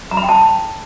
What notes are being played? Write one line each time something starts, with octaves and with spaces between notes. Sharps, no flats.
A#5
B5
G5
A5